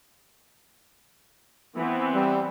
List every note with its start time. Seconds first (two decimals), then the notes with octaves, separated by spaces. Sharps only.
1.77 E3 B3 C4
2.14 G3